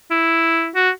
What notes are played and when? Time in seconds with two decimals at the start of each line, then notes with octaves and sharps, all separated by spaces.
0.11 E4
0.75 F#4